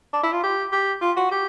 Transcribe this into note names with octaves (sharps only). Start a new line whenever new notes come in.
D4
E4
F4
G4
G4
F4
F#4
G4